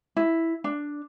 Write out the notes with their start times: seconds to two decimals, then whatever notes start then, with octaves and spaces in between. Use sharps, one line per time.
0.16 E4
0.64 D4